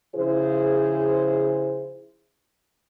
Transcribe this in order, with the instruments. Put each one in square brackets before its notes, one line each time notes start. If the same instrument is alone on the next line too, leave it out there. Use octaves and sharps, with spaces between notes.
[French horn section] C#3 F3 E4 G#4 C5